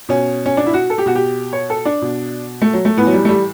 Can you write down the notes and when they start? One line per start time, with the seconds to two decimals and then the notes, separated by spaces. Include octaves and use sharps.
0.09 B2 C#4
0.46 C#4
0.57 D4
0.67 E4
0.74 F#4
0.90 A4
0.98 G4
1.06 B2 F#4
1.15 G4
1.53 C#5
1.70 A4
1.85 D4
2.02 B2
2.62 A3
2.74 F#3
2.85 A3
2.97 A2 E3 B3
3.07 F#3
3.14 G3
3.25 A3
3.29 G3